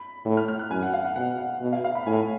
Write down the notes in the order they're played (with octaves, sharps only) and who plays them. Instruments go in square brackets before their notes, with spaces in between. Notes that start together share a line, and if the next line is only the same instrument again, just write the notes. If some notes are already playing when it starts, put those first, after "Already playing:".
Already playing: [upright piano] B5
[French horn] A2
[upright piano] F6
F6
F#6
[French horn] F#2 [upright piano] G#5
[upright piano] F#5
F5
F#5
[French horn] B2 [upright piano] F#5
[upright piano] F#5
[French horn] B2
[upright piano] F5
F5
B5
[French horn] A2 [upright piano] G#5